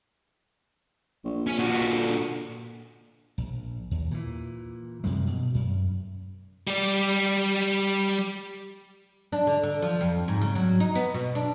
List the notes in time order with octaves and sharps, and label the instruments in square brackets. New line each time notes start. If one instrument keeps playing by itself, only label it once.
[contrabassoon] A#1
[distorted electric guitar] C#4 G#5
A#2 F#4
[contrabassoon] D3
[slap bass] A#1
D#2
A#2 E3
F#2 C3 G3 G#3
B2
F#2
[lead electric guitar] G3 D5
[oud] D4
D3
D3
F3
F2
G#2
C#3
F#3
D#4
B3
B2
D4